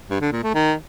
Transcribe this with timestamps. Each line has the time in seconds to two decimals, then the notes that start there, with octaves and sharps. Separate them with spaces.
0.10 G2
0.21 D3
0.32 A#2
0.43 A3
0.54 D#3